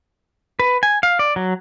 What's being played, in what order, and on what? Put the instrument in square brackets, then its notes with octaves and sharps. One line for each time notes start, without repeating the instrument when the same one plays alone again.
[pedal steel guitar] B4
G#5
F5
D5
F#3